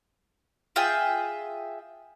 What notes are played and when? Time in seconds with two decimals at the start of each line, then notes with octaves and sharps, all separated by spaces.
0.76 F4 G#4 E5 G5